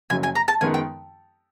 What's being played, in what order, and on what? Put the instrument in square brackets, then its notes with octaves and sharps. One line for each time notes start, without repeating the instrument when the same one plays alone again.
[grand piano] F#1 F#2 C#3 F#3 [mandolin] G#5
[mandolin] G#5
A#5
A5
[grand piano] F#2 D#3 G#3 B3 D#4 [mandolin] G#5
[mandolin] G5